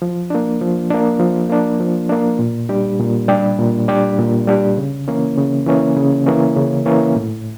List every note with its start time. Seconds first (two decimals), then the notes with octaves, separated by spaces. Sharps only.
0.02 F3
0.30 A#3 D4
0.61 F3
0.90 A#3 D4
1.20 F3
1.49 A#3 D4
1.80 F3
2.09 A#3 D4
2.39 A#2
2.69 G3 D4 G4
2.99 A#2
3.28 G3 D4 G4
3.59 A#2
3.88 G3 D4 G4
4.19 A#2
4.47 G3 D4 G4
4.77 C#3
5.08 E3 A#3 C#4
5.37 C#3
5.67 E3 A#3 C#4
5.96 C#3
6.26 E3 A#3 C#4
6.56 C#3
6.86 E3 A#3 C#4
7.16 A2